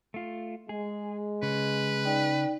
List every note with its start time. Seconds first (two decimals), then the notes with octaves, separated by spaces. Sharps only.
0.14 A3 F4
0.69 G#3 G#4
1.43 C#3 B4
2.05 D#4 D5 G5